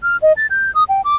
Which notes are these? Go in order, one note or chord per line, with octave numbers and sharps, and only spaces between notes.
F6
D#5
A6
G6
D#6
G5
D6